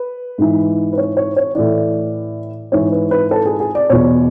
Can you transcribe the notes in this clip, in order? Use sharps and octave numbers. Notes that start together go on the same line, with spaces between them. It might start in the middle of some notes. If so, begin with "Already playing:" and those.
Already playing: B4
G#2 E3
B4
C#5
C#5
C#5
A2 E3 D5
G#2 E3 C#5
B4
B4
A4
G#4
G#4
D5
E2 B2 C#5